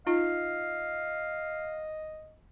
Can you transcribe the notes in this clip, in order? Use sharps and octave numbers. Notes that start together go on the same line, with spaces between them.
D#4 F4 D#5 F5